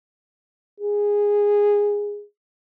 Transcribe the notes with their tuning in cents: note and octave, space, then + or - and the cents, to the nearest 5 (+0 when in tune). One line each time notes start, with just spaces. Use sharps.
G#4 -10